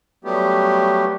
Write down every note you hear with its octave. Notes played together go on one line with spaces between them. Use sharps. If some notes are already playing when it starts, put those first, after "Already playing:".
F#3 G3 A3 B3 G4